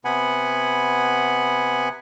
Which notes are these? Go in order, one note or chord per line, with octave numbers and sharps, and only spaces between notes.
C3 B3 F#5 G#5 B5